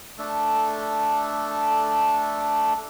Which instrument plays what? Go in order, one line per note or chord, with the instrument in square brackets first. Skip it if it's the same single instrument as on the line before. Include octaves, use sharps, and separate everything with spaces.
[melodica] A3 D4 A4